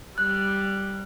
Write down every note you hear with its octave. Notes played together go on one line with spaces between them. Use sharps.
G3 F#6